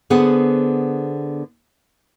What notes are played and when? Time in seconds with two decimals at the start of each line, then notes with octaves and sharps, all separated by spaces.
0.10 D3 B3 G#4 C5 F#5